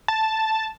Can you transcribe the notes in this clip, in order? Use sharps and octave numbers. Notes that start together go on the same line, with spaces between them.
A5